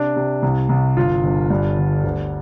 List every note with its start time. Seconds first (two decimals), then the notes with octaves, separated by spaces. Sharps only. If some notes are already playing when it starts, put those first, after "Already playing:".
Already playing: C3 D4
0.16 C3
0.42 C2
0.69 C2
0.97 G1 F4
1.23 G1
1.50 G2
1.78 D3
2.04 D2